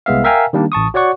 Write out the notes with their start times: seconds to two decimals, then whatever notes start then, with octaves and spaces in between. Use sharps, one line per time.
0.06 C2 G#3 B3 E5 F5
0.24 A#4 E5 F5 G5 G#5 A#5
0.53 D#3 G3 A#3 D4
0.72 A1 A5 C#6 D#6
0.94 F#4 C#5 D5 F#5 C#6